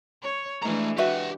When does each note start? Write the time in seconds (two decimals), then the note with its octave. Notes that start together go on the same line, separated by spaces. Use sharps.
0.22 C#5
0.62 E3 G#3 A3 D4 A#5
0.98 F#4 G4 B4 E5 F#5